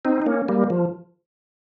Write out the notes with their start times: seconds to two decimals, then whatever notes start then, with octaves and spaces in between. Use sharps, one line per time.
0.05 C4 D#4
0.22 D#4
0.26 A#3 C#4
0.48 G3 A#3
0.70 F3